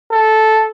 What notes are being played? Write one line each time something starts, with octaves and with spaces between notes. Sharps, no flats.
A4